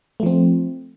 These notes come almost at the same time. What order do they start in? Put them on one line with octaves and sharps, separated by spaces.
A3 F3 C4